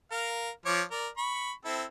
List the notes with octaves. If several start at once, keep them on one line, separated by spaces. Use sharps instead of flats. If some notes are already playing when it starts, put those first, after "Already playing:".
A#4 F5
F3 C#5 D6
A#4 D5
B5 C#6
C4 E4 A4